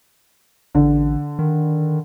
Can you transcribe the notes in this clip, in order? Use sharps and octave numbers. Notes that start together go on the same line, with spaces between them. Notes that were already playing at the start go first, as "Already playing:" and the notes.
A1 D3
D#3